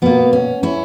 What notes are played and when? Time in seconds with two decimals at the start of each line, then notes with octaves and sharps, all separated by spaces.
0.02 B2 A#3 B3
0.33 C#4
0.63 C#4 E4